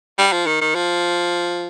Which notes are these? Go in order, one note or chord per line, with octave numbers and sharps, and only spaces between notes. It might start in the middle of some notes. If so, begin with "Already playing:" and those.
G3
F3
D#3
D#3
F3